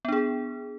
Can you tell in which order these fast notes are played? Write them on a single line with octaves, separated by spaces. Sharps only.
B3 D4 G#4